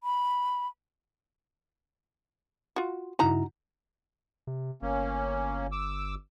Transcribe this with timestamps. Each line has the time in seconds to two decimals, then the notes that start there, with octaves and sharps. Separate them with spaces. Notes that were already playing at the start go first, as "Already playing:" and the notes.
0.03 B5
2.76 F4 F#4
3.19 G2 C#3 D#4 E4 F#4 A#5
4.47 C3
4.82 G1 A#3 C#4
5.72 D6 E6